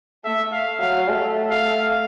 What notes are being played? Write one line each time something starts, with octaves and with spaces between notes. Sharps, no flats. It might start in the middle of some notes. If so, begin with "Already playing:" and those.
A3 E5
F5
F#3 F5
A3
F5